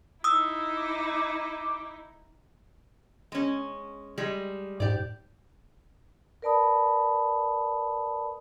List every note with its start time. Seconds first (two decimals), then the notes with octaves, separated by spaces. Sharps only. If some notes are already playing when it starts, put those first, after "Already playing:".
0.24 D#4 E4 D#6 E6
0.77 D6
3.32 G#3 C#4
4.18 G3 G#3
4.80 G#2 G4 D5
6.42 A#4 B4 D5 A5 B5 D#6